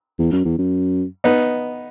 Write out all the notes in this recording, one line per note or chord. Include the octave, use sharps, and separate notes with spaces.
E2
F#2
E2
F#2
B3 D#4